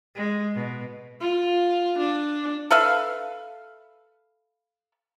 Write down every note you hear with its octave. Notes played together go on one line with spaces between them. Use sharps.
G#3
B2
F4
D4
A4 B4 E5 F5